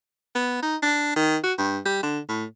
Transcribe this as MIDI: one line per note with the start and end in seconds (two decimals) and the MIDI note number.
0.35 0.61 59
0.63 0.76 63
0.83 1.13 62
1.16 1.37 51
1.44 1.53 66
1.58 1.79 43
1.85 2.00 55
2.03 2.19 50
2.29 2.45 45